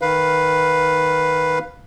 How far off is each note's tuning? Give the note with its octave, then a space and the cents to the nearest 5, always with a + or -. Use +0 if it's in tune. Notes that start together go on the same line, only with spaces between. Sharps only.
D#3 +0 B4 +0 F5 +10